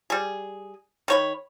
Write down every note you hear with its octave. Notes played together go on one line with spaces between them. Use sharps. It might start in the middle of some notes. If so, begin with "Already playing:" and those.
G3 G#4
D#3 C#5 B5